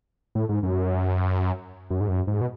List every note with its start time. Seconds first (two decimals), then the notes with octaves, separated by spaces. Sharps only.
0.35 A2
0.49 G#2
0.63 F#2
1.90 F#2
2.01 G#2
2.08 F#2
2.27 G#2
2.41 B2